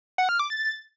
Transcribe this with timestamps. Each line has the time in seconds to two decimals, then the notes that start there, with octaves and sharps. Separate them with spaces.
0.18 F#5
0.29 F6
0.39 D6
0.50 A6